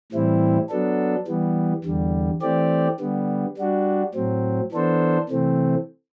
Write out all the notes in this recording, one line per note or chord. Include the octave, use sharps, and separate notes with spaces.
A2 E3 G3 C4 E4
F#3 B3 D4 A4
E3 G3 B3
E2 D3 G3
E3 A3 C4 G4 D5
D3 G3 B3
G3 D4 F#4
A2 F#3 C4
E3 B3 D4 A4 C5
C3 E3 A3 C4